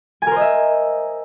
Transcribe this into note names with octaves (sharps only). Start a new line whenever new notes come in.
A#4 C5 D#5 E5 G#5